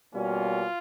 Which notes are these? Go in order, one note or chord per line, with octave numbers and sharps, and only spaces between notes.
B2 G3 A#3 C#4 F4